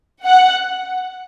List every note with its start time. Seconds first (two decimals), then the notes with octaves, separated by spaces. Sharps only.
0.24 F#5